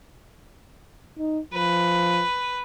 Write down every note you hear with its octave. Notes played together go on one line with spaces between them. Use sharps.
D#4
F3 B4